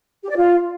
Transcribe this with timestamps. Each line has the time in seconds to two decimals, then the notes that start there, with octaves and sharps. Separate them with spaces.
0.23 G4
0.29 D5
0.36 F4